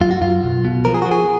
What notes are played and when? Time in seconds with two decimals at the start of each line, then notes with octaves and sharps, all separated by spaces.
0.01 F#2 F4
0.11 F#4
0.21 F#2 F4
0.43 B1
0.65 B2
0.85 F3 A#4
0.94 G#4
1.02 F#4
1.06 F3
1.11 G#4